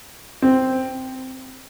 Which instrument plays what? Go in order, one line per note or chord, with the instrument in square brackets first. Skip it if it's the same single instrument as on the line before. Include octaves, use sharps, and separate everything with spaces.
[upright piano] C4